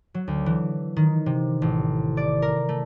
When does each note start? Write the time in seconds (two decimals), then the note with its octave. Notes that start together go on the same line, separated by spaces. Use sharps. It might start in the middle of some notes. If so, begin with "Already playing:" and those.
0.14 F#3
0.28 D2
0.46 E3
0.97 D#3
1.26 C3
1.62 A1
2.17 D5
2.42 A#4
2.69 A3